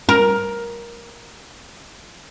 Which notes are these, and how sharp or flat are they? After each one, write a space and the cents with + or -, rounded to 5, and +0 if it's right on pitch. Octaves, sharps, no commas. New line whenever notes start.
A#4 +15